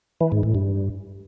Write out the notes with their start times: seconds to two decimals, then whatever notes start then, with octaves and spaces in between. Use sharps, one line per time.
0.21 E3
0.32 G#2
0.43 A2
0.55 G2